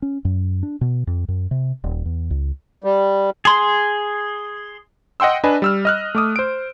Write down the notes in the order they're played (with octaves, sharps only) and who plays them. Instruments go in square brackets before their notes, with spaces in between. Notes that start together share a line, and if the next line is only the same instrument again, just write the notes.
[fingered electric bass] C#4
F#2
D4
B2
F2
F#2
C3
D#1
E2
C#2
[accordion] G3
[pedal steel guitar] G#4 C6
[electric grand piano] D#5 F#5 G5 C6 E6
D4 B4 D#5 G#5
G3 E6 F6
D#5 F6 F#6
A3 D6 D#6
C5 D7